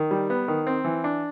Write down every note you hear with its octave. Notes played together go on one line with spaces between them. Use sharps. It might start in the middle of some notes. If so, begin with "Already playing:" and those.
Already playing: D#3
G3
B3
D#3
C4
E3
D4